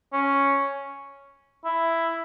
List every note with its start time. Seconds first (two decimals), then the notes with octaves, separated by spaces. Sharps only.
0.13 C#4
1.65 E4